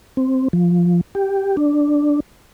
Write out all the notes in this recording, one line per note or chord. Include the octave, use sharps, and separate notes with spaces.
C4
F3
G4
D4